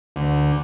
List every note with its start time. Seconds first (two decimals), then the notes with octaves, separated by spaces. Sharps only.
0.16 D2